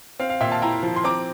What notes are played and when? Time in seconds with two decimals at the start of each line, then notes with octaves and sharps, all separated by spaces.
0.20 C4 F5
0.30 F5
0.41 A#2 E5 G5
0.51 F5 A5
0.62 E4 G5 A#5
0.83 F3
0.96 C6
1.04 C4 A#5 D6